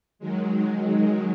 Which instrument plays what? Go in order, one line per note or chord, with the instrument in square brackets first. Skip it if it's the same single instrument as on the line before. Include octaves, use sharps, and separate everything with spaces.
[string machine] D#3 F#3 G#3